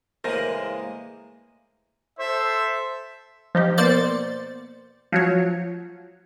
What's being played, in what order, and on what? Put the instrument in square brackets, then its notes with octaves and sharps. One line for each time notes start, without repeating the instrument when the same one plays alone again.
[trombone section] A2 G#3 A#3 [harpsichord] C#3 E3 [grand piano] A#4 C5 A#6
[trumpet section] A4 C5 [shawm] E5
[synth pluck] F3 D#4 G4
B2 A#3 C5 D5 A6 C#7
F3 F#3 C#5